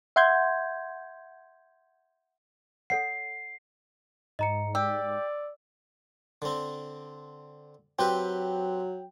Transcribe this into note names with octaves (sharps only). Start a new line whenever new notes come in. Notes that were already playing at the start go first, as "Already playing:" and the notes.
E5 F#5 C6 G6 G#6
A4 C#5 F#5 C7
G#2 D#5 A#5 C#7
G4 D5 E6
D3 C4
F#3 C4 G4 B4 G5